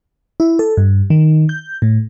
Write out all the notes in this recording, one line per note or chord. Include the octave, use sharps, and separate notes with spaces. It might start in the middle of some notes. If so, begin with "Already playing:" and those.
E4
A4
G2
D#3
G6
A2